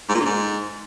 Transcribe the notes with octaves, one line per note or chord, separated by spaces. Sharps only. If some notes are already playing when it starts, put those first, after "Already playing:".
G#2
A#2
D3
G#2